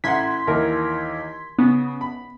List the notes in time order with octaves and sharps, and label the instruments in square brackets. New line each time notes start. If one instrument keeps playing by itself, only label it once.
[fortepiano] A1 F#5 [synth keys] C6 G#6 B6
[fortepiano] D#2 E3 A#4
[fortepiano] C#3 [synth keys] B3
[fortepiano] B5